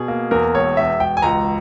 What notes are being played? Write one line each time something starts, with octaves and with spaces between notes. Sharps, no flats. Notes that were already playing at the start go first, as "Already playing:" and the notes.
Already playing: B2 G#4
A#3
E2 A#4
E1 C#5
E1 E5
E1 G5
G#5
C#2 A#5